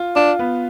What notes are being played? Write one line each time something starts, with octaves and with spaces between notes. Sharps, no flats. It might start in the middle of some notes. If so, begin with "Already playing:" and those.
Already playing: F4
D4 F4
B3